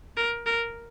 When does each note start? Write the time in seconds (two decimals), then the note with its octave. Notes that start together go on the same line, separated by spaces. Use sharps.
0.17 A#4
0.46 A#4